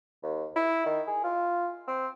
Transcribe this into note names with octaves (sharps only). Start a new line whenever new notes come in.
D#2
E4
D#3
G#4
F4
C4